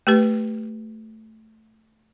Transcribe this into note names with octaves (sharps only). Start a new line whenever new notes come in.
A3 G4 B4